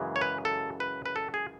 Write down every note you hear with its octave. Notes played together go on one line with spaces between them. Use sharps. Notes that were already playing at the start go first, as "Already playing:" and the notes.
Already playing: F#2 C#3 E3 G#3
C#5
B4
A4
B4
B4
A4
G#4